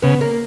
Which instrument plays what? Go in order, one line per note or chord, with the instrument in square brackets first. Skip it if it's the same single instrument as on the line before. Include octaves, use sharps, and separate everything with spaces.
[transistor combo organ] C#3 [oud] B3
[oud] A#3